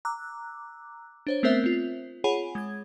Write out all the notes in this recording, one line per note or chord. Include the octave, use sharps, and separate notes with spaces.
A#5 D6 E6 F#6
D4 C5 C#5
A3 B3 C4 A#4 C5 E5
C4 F4
F4 G#4 C#5 F#5 G#5 B5
G#3 G#6